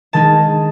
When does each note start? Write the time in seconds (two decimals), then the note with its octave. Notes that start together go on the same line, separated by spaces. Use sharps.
0.13 D#3 G#3 D#4 A5